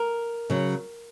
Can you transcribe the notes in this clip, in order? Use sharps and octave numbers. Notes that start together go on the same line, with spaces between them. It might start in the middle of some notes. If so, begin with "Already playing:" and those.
Already playing: A#4
C#3 F#3